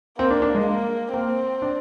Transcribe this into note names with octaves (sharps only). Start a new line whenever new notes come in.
A#3 C4
D4
D4
G#3
A#3
A#3 C4
D4